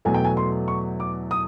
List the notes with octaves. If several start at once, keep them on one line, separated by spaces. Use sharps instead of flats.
E2 B2 F#3 A3 G#5
G5
G#5
C6
C#6
D6
D#6